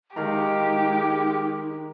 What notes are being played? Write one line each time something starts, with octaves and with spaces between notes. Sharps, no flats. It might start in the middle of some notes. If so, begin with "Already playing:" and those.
D#3 G#3 D#4 G4 F5 A#5